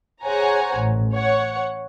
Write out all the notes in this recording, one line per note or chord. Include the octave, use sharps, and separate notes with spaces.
G#4 C5 C#5 F#5 G#5 A#5
A1
C#5 F#5